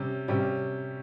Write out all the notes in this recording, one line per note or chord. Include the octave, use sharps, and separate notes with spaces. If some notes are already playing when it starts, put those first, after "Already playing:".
Already playing: C3 G3 C#4
C3 G3 C#4